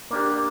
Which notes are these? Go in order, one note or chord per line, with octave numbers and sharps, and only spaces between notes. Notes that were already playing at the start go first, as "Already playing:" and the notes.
A#3 D4 G4 D6